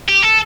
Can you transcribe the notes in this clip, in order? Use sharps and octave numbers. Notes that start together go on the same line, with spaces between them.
G4
A4